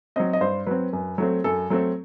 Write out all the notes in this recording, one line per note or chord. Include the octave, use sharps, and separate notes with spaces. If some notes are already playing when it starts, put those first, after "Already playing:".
F#3 C4 D#5
D#5
G2 C5
F#3 C4 B4
F#2
F#3 A3 C4
F#2 A4
F#3 A3 C4